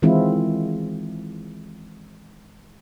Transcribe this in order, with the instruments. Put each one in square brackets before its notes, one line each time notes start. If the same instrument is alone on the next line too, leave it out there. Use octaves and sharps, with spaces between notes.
[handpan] D#3 E3 G#3 C4 E4 F4